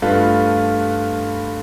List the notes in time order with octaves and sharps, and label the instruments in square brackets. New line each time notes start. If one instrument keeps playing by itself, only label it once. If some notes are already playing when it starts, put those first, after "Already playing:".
[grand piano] G2 A3 F4 B4